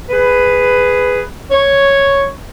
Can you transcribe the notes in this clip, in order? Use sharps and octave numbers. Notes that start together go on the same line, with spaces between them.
G#4 B4
C#5